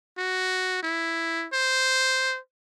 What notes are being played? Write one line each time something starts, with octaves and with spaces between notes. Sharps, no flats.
F#4
E4
C5